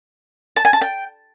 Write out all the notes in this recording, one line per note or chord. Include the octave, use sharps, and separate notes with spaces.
A5
G#5
A5
G5